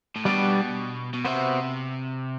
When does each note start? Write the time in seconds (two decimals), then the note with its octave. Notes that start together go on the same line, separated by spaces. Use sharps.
0.16 A2
0.25 B2 G3 B3 D4 G4 D5
1.14 B2
1.25 C3 B3 F#4 C5 E5